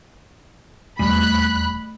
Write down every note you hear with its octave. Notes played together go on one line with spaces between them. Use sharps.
D#1 E2 G3 A3 B5 F#6